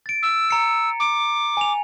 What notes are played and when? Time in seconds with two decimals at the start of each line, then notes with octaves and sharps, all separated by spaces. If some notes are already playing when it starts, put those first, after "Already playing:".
0.06 A6 D7
0.22 E6
0.51 A#5 C#7
1.00 D6
1.57 G#5 F7